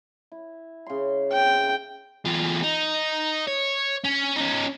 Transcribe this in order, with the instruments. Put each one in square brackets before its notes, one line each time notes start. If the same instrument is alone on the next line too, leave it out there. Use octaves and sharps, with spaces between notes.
[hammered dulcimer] E4
C#3 C6
[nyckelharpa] G5
[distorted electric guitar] E2 F4
D#4
C#5
C#4
C#4 D#4